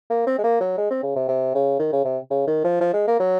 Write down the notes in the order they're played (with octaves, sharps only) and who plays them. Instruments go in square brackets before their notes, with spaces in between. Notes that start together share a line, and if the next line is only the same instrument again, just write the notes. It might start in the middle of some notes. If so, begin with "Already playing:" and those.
[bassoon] A#3
C4
G#3
A#3
F#3
G#3
C4
C#3
C3
C3
C#3
D#3
C#3
C3
C#3
D#3
F3
F3
G#3
A#3
F#3